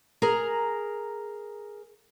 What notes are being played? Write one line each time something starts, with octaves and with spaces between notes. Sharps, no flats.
G#4 A#4 A#5